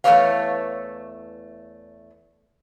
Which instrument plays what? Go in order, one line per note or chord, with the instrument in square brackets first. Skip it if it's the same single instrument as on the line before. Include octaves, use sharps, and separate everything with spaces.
[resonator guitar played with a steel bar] E2 A3 A#4 B4 C#5 F5